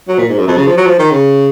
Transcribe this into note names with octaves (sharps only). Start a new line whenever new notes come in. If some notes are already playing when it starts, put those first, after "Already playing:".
F#3
A#2
G#2
F#2
F2
C#3
F3
F#3
F3
D#3
C#3